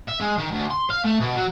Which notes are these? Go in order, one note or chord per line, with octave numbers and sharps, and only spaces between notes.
E5
G#3
D#3
D2
C6
F5
A3
B2
F#3